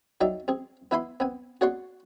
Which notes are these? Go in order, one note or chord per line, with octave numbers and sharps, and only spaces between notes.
F#3 D#4 D5 E5 G5
C4 G#4
B3 E4 E5 G#5 B5 C6
B3 C4 G#5
F#4 G#4 C#5 D5 F#5 C6